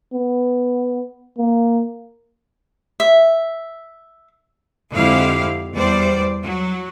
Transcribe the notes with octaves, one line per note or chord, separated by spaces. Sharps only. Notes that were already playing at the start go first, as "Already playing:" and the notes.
B3
A#3
E5
F2 D3 G#3 E4 G4 F5
E2 G3 C5 D5
F#3